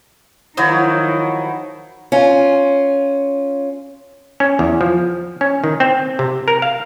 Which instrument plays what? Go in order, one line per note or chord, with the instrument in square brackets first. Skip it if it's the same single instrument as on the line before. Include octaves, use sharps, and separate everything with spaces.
[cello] D#3 [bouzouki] F3 F#3 [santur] D#4 E4 C#5
[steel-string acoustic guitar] C#4 F4
[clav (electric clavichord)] C#4
E2
F3
C#4
D#3
C4
C3
A#4
F5